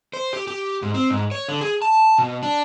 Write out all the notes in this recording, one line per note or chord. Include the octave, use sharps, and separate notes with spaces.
C5
G4
G4
G#2
C4
G#2
C#5
D3
G#4
A5
B2
D4